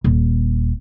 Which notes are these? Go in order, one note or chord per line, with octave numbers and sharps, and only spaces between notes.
D#1